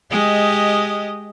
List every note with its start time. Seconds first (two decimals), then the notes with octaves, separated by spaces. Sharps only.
0.11 G#3 G4 D#5